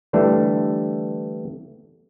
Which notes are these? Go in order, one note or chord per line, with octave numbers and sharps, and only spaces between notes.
D3 E3 G3 A3 D4